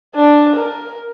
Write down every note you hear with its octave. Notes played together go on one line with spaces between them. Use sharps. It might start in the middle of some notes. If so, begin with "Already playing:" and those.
D4
A#4